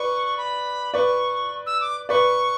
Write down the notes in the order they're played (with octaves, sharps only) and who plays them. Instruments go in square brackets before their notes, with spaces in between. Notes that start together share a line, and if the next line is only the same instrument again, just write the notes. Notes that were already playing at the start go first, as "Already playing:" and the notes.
Already playing: [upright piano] B4 D5 [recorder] C#6
[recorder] B5
[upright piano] B4 D5 [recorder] C#6
[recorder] E6
D6
[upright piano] B4 D5 [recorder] C#6